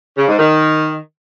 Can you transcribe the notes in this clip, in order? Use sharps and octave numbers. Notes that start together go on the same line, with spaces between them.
C#3
G#2
D#3